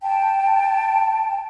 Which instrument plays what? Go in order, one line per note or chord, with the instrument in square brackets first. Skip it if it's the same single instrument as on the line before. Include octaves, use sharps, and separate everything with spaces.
[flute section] G5 A5